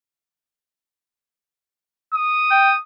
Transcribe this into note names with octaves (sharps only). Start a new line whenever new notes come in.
D#6
G5